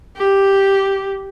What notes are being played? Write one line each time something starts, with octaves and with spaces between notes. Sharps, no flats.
G4